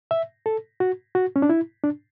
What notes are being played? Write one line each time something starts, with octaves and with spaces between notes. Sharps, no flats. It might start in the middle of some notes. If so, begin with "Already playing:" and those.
E5
A4
F#4
F#4
C#4
D4
E4
D4